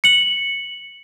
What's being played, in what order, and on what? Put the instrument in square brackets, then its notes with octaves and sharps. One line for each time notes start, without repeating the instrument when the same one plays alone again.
[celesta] C#7 F#7